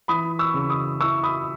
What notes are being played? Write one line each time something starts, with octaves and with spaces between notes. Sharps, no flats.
E3 B5 D#6
C#6 E6
C#3
C#6
B5 D#6
E4 C#6 E6
B5 D#6